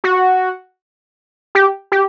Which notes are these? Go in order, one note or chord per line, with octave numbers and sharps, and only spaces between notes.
F#4
G4
G4